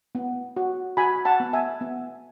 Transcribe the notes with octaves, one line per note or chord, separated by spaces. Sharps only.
B3
F#4
F#4 G#5 B5
F#5 A5
B3
E5 G#5
B3